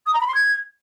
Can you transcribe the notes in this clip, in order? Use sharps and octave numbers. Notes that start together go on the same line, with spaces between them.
D#6
A#5
B5
C6
G#6